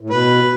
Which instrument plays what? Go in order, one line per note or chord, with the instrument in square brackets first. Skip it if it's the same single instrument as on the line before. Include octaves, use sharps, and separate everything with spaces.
[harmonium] A2
[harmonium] B2 [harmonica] B4